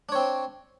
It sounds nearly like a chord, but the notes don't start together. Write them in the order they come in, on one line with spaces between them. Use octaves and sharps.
D4 C#5 C4